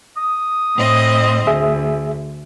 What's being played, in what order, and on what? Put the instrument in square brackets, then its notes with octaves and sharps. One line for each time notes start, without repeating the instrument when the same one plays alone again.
[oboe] D#6
[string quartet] A2 C4 D#5
[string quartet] D2 [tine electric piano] G#4 E5